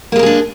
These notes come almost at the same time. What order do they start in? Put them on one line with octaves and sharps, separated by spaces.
A#3 G#3 A#4 G#4 D4